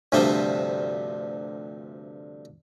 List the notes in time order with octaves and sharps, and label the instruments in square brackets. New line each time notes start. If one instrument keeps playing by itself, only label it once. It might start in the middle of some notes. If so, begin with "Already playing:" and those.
[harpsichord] D2 G2 C3 F3 G3 C5